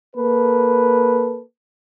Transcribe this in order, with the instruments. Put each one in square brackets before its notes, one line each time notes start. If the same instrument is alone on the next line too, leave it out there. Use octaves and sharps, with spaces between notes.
[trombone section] A#3 A4 B4